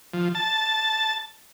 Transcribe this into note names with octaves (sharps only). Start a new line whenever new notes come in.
F3
A5